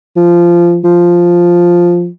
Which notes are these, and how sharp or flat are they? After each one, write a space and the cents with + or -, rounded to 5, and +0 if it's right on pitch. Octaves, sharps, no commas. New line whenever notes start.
F3 -15
F3 +0